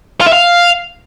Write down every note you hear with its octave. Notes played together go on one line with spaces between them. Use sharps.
F4
E5
F5